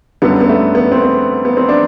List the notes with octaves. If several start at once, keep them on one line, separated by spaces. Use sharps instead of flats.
F#2 D3 G3 B3
B3
A3
B3
C4
B3
B3
C4
D4